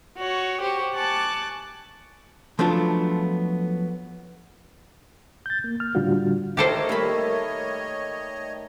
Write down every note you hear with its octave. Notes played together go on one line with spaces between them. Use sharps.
F#4 C#5
G4 C5 C#6
G#5 A5 C#6 D6 F#6 A6
F3 F#3 A3 B3 D4 F4
G6 A6
A#3
F6
A2 D3 G3 D4 F4 F#4
D#3 A3 G4 A4 C5 C#5 D#5
G3 A3 A#3 B5